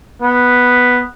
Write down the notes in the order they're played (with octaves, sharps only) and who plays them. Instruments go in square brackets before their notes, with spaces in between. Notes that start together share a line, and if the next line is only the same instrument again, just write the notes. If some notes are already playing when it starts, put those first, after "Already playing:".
[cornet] B3